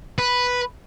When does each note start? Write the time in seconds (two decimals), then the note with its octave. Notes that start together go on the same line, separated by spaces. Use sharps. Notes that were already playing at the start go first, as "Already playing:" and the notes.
0.18 B4